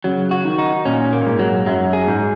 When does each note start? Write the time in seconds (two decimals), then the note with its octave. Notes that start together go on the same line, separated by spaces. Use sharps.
0.04 C#3 F#3
0.31 F#4
0.45 D#3
0.58 D#4
0.85 A#2 C#4
1.13 A#3
1.21 A#2
1.26 G#2
1.39 F#3
1.66 F#2 F#3
1.93 G#4
2.07 G#2